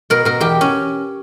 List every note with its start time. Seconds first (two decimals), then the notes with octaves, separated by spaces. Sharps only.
0.10 B2 A#4
0.25 B2 A#4
0.40 E2 G4
0.61 C#4